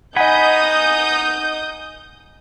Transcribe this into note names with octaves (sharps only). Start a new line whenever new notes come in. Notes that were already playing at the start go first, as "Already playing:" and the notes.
D#4 D#5 F#5 G#5 B5 D#6 G6